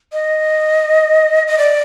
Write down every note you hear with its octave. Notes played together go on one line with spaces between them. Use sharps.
D#5
D#5
D5